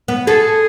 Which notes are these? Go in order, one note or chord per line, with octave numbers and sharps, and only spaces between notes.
B3
G#4 A4